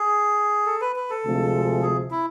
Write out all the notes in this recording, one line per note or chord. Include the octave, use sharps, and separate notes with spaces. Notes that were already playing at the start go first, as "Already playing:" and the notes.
Already playing: G#4
A4
B4
B4
A4
D2 C3 F3 G#3
G#4
E4